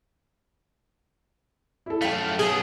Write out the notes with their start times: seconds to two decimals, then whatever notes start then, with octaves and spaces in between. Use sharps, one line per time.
1.86 E4 A4
2.02 F#2 A3 F5 G5 B6
2.39 B2 F#3 G#4